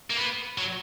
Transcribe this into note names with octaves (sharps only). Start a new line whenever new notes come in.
A#3
B3
F#3